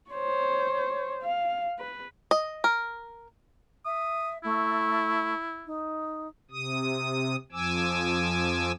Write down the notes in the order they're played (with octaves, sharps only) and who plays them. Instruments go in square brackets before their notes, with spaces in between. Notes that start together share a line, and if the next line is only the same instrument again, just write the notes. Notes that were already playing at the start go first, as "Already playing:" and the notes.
[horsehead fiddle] C5 C#5
F5
B4
[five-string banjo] D#5
A#4
[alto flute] E5 [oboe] D#6
[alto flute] A3 [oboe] E4
[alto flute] D#4
[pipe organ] C3 D#6
F2 F3 G#5 D6 E6